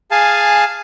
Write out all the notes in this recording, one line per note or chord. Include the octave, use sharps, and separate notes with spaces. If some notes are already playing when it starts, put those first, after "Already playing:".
G#4 F5 G#5 A5